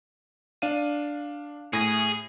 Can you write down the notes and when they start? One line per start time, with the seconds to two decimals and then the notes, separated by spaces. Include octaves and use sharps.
0.62 D4 F5 D#7
1.73 A2 G#4 A#6